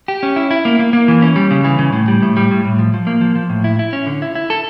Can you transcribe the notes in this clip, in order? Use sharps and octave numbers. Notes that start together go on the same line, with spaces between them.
G4
C#4
E4
E4
A#3
A#3
A#3
E3
C#4
G3
C#3
E3
C#3
A2
G3
A2
G3
A2
A2
F3
F3
A#3
F3
F3
A2
E4
E4
C#4
D3
E4
E4
A4